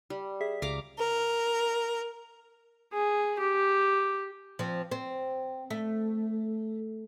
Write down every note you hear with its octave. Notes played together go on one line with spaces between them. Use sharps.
G3
G#4 E5 B6
C#2 F5 A#5 D6
A#4
G#4
G4
F3 C4
C4
A3